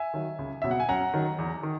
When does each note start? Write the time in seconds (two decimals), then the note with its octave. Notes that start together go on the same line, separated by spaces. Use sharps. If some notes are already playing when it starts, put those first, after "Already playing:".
Already playing: E5 G#5
0.14 D#3 F#3
0.39 C#2
0.62 B2 F#3 E5
0.71 F#5
0.80 G#5
0.89 F#2 F#5 A#5
1.14 D#3 F#3
1.38 E2
1.63 D#3